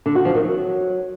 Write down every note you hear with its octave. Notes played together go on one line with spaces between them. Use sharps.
D3
F#4
F3
D#3
F#3